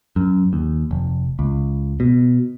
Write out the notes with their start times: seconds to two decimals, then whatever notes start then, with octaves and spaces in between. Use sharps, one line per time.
0.16 F#2
0.53 D#2
0.91 F1
1.39 C#2
2.00 B2